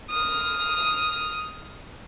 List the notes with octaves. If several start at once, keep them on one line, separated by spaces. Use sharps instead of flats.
D#6 F6